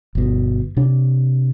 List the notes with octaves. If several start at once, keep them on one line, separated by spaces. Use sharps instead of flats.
G1 B2
C3 D4